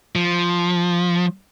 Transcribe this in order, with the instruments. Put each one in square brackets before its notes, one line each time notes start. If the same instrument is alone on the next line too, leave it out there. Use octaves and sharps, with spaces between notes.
[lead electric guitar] F3